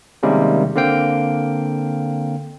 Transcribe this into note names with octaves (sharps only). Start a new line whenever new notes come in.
C3 D#3 G3 G#3 A#3 C#4
D3 A#3 C4 F5 G5